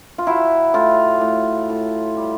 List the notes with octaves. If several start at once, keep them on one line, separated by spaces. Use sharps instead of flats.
F4
F#3 E4
A2 F4
A2
A2
G3